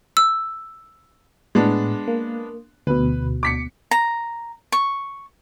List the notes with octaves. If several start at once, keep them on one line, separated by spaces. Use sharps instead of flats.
E6
A2 G#3 B3 D4
A#3
D2 B2 B4
D6 B6 C#7
A#5
C#6